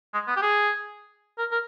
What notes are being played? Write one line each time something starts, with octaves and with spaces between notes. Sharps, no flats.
G#3
B3
G4
G#4
A#4
A#4